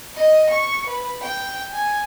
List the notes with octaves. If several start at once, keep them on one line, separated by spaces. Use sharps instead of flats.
D#5
C#6
B4
G5
G#5